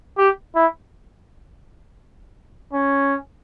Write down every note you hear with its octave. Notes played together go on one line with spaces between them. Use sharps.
G4
E4
C#4